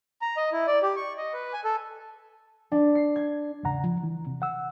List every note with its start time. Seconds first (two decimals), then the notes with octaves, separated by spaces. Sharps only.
0.21 A#5
0.37 D#5
0.52 E4
0.67 D5
0.83 G4
0.96 C#6
1.18 D#5
1.33 B4
1.53 G#5
1.64 A4
2.72 D4
2.95 C7
3.16 G#6
3.63 E2 G#2 C#3 F#5 A#5
3.84 F3
4.03 E3
4.27 C3
4.42 F#5 E6